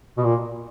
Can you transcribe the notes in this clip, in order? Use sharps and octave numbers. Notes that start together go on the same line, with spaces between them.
B2
A#2